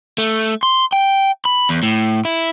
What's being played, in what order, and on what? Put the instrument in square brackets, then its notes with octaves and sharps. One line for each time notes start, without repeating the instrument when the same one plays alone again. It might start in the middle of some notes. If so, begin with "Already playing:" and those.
[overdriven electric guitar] A3
C6
G5
B5
E2
A2
E4